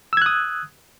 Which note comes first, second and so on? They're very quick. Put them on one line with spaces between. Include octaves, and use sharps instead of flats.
E6 G#6 F#6 D#6